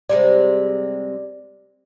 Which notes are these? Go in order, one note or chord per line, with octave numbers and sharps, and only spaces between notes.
C3 G3 G#3 D5